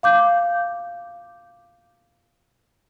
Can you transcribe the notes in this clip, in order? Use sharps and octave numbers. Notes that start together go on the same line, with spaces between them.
F5 D6 G6